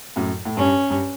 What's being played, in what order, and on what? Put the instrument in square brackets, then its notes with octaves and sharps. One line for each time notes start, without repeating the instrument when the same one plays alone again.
[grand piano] F#2 A2
A2
[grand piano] G2 [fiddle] C#4
[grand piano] G2